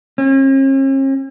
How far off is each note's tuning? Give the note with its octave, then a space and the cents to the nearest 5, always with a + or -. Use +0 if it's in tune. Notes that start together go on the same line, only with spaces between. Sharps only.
C#4 -45